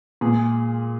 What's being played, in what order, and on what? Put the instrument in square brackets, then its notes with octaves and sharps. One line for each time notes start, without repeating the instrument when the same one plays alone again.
[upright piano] A#2 G#3 G#4